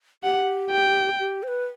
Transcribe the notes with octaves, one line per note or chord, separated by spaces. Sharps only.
G4 F#5
G5
G4
C5
B4